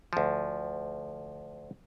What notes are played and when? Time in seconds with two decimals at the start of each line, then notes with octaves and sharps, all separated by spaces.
0.13 D2 F3